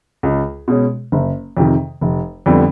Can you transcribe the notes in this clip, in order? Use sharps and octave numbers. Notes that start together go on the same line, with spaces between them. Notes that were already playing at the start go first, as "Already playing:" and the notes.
C#2
B2 G#3 C#4
F#1
F2 C3 D#3
F1
F2 D3 G3 B3